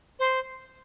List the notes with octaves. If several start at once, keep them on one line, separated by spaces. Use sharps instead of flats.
C5